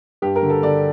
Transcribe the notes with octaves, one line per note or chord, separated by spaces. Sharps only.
G2 G4
A#4
D3
A4
D3 D5